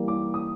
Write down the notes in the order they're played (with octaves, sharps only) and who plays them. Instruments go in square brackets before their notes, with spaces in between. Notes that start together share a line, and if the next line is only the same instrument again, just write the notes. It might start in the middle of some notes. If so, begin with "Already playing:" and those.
Already playing: [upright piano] E3 G3 A#3
D6
D#6